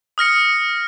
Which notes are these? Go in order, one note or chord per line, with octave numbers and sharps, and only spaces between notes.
D#6 F6 A#6 C#7